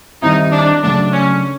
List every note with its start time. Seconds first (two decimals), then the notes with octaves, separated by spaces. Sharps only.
0.22 D#3 G3 C4 D#4 E4
0.53 D4
0.83 C#3 F#3 A3 D4
1.13 C#4